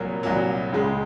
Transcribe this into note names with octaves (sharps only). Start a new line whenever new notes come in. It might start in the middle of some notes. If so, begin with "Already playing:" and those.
Already playing: C2 A#2 F#3 A#4 C#5
C2 A#2 F#3
C#2 C#3 G#3